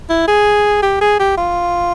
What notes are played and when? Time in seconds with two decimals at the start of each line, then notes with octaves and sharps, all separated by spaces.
0.09 E4
0.27 G#4
0.82 G4
1.01 G#4
1.19 G4
1.38 F4